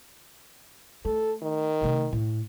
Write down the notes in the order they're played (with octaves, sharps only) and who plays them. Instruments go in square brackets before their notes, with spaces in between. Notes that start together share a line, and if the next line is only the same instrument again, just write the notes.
[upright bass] A3 [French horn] A4
[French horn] D#3
[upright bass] C3 A3
A2